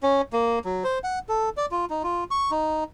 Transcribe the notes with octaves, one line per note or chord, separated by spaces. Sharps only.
C#4
A#3
F#3
C5
F#5
A4
D5
F4
D#4
F4
C#6
D#4